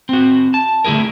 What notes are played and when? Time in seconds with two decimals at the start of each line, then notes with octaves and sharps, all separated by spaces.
0.09 C4 F#4
0.54 A5
0.85 D3 A3 E4 G#4 A#4